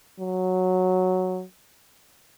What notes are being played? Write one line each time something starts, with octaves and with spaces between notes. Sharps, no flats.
F#3